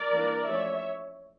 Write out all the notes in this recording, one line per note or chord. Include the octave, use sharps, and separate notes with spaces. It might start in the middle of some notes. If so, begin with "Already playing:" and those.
Already playing: A#4 D5
E3 A#3 D4
F3 A3 C#4 C#5 E5